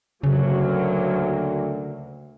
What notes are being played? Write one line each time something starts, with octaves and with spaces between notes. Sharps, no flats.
D2 C#3 F#3 A#3